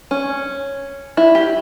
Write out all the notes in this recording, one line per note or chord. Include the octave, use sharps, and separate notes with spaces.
C#4
E4
G4